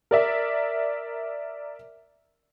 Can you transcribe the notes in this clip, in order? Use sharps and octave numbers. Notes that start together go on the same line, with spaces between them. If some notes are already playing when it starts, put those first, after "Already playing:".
A#4 D5 E5